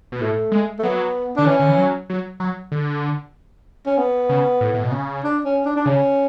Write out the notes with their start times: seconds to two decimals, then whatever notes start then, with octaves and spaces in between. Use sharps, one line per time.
0.12 B2
0.21 A2 A3
0.52 G#3
0.79 A3
0.83 F#3 B3
1.36 D3 D4
1.46 E3 C#4
1.60 D3
1.68 E3
1.78 F#3
2.10 F#3
2.40 F#3
2.72 D3
3.86 C#4
3.98 B3
4.29 C#3
4.61 A2
4.74 A2
4.84 B2
4.92 C#3
5.24 D4
5.45 C#4
5.65 D4
5.76 D4
5.86 C#3 C#4